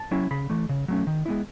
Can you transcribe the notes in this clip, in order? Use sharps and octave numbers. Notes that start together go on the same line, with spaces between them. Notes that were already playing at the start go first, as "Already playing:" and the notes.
Already playing: A5
F#3 C#4 E4
C#3 B5
E3 A3
C#3
F#3 A3 C#4
D#3
G#3 B3 E4